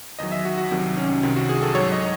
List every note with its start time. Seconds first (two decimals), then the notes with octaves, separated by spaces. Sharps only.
0.19 E2 D#3 F#3 D#5
0.32 E5
0.45 F#4
0.58 F#4
0.71 C2 C3 D#3 F#3
0.97 C#4
1.23 C2 C3 D#3
1.36 F#4
1.49 G#4
1.63 A4
1.74 G#2 F#3 C#5
1.92 D#5